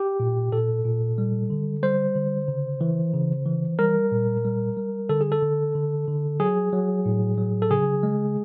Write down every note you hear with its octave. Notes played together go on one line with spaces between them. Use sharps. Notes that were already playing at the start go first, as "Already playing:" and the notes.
Already playing: G4
A#2
A#2 A4
A#2
G3
D3
G3 C5
D3
C#3
E3
C#3
E3
G3 A#4
A#2
G3
G3
D3 A4
G#4
A4
D3
D3
D3
F#3 G#4
F#3
A2
F#3
A4
C#3 G#4
G#3